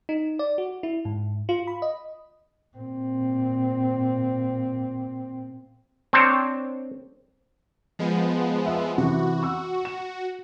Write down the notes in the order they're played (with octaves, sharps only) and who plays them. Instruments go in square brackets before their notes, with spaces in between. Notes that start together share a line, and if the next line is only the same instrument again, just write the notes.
[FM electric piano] D#4
D5
F#4
E4
G#2
F4
B5
D#5
[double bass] A#2 C4
[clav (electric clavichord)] C4 D4 C5 C#5
[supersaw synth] F3 G#3 B3
[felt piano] E5
[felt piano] C3 E3 [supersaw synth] F#4
[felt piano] C#6 E6
E7